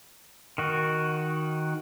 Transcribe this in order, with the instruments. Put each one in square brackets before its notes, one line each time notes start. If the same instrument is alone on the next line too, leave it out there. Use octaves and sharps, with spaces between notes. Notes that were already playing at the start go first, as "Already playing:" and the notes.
[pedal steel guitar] D#3 F#4